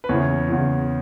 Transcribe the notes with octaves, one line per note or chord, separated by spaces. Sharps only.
B4
E2 C#3 E3 C#5
E2 C#3 E3